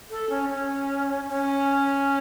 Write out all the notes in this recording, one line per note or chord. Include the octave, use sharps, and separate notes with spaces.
A4
C#4
C#4
C#4